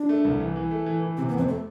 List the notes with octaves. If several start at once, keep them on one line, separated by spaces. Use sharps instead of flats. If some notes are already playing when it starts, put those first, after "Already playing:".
Already playing: D4
A3
C2
E3
E3
A3
E3
E3
C3 C4
B3
F2 C4
A3